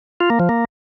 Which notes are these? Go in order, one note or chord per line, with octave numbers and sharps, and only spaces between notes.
F4
A#3
F3
A#3